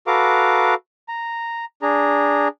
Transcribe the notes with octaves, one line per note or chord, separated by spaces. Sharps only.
F#4 A4 B4 F5 A#5 D6
A#5
D4 G#4 A#5